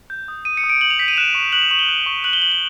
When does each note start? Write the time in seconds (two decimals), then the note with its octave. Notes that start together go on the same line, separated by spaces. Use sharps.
0.10 G6
0.28 D#6
0.45 D#6 D#7
0.57 C#7
0.64 D#6
0.69 D7
0.81 G6 F#7
0.90 F7
0.99 G6 B6
1.08 D#7
1.13 F7
1.17 F#6 E7
1.35 C#6
1.52 F#6 F#7
1.62 F7
1.71 C#6 F#7
1.79 G7
1.89 F#6
2.06 C#6
2.24 F#6 F#7
2.33 G7
2.42 C#6 F#7
2.52 F#7